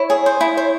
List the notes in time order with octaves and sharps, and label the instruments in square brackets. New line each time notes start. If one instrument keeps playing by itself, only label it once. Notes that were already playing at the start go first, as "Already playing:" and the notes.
Already playing: [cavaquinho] E4 [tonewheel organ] C#5
[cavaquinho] G#4
C5
E4
[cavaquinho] C5 [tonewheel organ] C#5